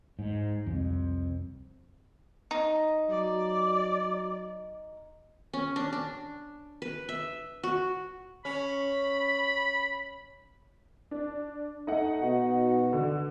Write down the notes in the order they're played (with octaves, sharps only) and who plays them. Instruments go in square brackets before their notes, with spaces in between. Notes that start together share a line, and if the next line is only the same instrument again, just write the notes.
[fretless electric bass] G#2
C2 F2
[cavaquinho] D#4
[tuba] F#3 [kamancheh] D5
[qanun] C#4
D4
D4
B4
E5
F#4
[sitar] C#4 [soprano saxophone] B5
[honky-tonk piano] D4
[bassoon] A3 [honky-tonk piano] D#4 F#5
[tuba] B2 [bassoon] F#4
[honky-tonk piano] D3